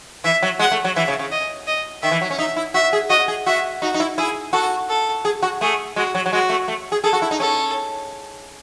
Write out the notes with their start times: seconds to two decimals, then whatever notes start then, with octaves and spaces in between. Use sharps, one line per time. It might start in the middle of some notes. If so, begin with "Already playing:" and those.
0.24 E3 E5
0.42 F#3
0.59 G#3 F#5
0.72 A3
0.84 F#3
0.96 E3 E5
1.08 C#3
1.19 C#3
1.32 D#5
1.67 D#5
2.02 D#3 E5
2.11 E3
2.21 F#3
2.30 C#4
2.38 D#4 E5
2.56 E4
2.74 F#4 E5
2.93 G#4
3.10 F#4 D#5
3.28 G#4
3.46 F#4 E5
3.82 D#4 F#4
3.94 D#4
4.00 E4
4.18 E4 G#4
4.53 F#4 A4
4.89 A4
5.25 G#4
5.42 F#4
5.61 A3 G#4
5.96 G#3 F#4
6.15 F#3
6.26 F#3
6.32 G#3 F#4
6.49 A3
6.68 A3
6.92 G#4
7.04 G#4 A4
7.13 F#4
7.22 E4
7.31 D#4
7.40 C#4 A4